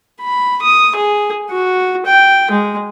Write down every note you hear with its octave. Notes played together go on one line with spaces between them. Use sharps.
B5
D#6
G#4
F#4
G5
G#3